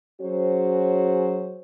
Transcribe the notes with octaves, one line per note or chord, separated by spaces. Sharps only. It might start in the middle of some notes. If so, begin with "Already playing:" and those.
F#3 C#4 F#4 G#4 C5